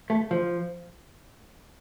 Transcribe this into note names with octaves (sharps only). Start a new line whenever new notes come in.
A3
F3